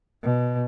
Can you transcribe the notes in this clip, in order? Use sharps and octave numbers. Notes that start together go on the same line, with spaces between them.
B2